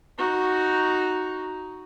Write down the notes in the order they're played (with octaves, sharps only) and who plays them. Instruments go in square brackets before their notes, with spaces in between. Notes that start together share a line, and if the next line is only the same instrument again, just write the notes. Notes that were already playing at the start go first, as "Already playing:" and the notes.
[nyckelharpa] D#4 F#4